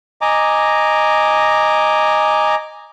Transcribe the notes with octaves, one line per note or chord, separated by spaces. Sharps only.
D#5 G#5 A#5 D6